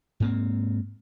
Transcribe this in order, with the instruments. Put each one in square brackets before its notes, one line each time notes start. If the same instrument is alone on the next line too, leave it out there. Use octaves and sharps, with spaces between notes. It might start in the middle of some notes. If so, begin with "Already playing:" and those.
[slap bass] G#2 A#3 C4